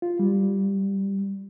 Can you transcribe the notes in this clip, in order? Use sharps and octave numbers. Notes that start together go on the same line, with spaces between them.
F4
G3